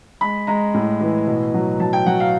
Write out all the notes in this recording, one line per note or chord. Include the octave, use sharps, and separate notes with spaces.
G#3 B5
G#3 A#5
A2
E3
B2
F#3
F#3 A5
G5
F#3 F#5
F5